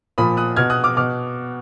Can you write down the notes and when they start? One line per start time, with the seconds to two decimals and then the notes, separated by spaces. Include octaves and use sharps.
0.18 A#2 F3 B5 D#6
0.37 D#6 F#6
0.56 B2 F6 G#6
0.70 D#6 F#6
0.84 D6 F6
0.97 B2 D6 F6